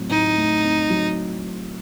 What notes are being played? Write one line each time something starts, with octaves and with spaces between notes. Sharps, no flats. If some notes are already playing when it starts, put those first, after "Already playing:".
Already playing: A2 F#3 A3 C4
A2 D#4
A3
C4
F#3